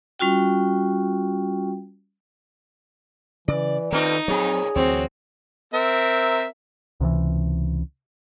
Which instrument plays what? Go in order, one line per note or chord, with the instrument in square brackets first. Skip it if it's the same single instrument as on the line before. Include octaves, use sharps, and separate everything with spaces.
[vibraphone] G3 C#4 F4 F#4 G5
[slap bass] C#3 [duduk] E3 [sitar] D5
[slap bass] D#3 [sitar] A3 C4 F4 [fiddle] D#4 [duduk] B4
[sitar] F2 A#2 C#5 [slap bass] F#3 C4 [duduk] G#4
[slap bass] D2 E3 F#3 [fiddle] C4 [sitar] F#4 C#5
[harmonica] C4 A#4 E5
[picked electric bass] C#2 C3 D#3 E3